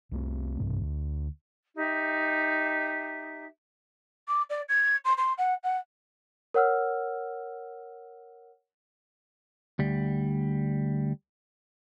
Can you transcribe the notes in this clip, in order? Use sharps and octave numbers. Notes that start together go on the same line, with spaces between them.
C2 A3 C4
B1 G2 C3
D2
D#4 G4 E5
D6
D5
G#6
C6
C6
F#5
F#5
A#4 C#5 F#5 E6 F6
D2 G3